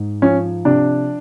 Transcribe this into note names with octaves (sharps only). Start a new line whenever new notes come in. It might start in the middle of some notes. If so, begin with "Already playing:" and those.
Already playing: G#2
F3 C#4
C3 D4